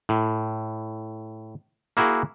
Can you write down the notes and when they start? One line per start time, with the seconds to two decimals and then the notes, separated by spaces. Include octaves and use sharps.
0.09 A2
1.97 A#3 E4 F#4 G#4